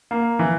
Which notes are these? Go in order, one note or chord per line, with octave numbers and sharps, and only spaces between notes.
A#3
E3